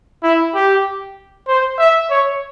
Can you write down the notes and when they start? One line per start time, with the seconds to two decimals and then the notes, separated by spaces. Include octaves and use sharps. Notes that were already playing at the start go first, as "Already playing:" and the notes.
0.24 E4
0.55 G4
1.48 C5
1.79 E5
2.11 C#5